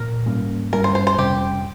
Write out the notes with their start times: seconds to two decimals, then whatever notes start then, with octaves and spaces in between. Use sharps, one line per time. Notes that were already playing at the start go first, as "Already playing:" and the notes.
Already playing: A#2 A#4
0.26 G#2 G3 A#3 C#4
0.73 G2 G3 A#3 C#4 A#4
0.84 C5
0.95 C5
1.07 C5
1.17 F2 C3 G3 C#4 G4